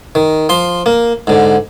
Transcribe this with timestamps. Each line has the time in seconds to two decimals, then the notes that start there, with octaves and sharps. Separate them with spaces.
0.15 D#3
0.49 F3 C6
0.86 A#3
1.27 G#2 D3